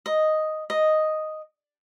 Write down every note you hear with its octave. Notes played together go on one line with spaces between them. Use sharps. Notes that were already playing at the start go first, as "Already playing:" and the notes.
D#5
D#5